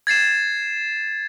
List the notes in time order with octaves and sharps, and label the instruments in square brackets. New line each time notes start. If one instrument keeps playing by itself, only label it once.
[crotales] G#6 A6 C7 E7